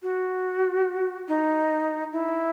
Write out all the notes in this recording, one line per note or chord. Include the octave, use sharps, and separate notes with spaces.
F#4
D#4
E4